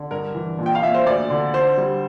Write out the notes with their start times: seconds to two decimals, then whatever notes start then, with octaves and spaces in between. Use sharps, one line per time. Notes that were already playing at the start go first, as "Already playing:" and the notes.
Already playing: D3
0.11 G2 A#4
0.35 E3
0.59 A#2
0.66 G5
0.75 F5
0.82 A#2 E5
0.94 C5
1.06 D2 D5
1.30 D3
1.54 D3 C5
1.77 G3